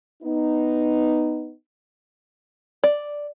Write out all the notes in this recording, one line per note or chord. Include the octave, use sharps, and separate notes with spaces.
B3 D#4
D5